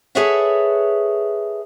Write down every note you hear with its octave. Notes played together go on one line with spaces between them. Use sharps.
G#4 A4 B4 C#5 E5 F#5